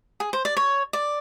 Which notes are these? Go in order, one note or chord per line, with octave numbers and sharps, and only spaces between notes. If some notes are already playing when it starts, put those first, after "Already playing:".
G#4
C5
D5
C#5
D5